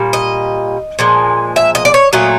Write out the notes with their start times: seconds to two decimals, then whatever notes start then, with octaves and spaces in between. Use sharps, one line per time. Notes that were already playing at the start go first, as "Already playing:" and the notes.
Already playing: A#2 G3
0.13 D#5
0.99 A#2 F3 G#3
1.56 E5
1.75 D#5
1.85 D5
1.94 C#5
2.13 A#2 F#3 A3 D#5